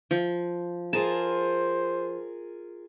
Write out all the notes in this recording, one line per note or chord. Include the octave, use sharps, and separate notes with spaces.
F3
F4 G#4 A#4 C5 A5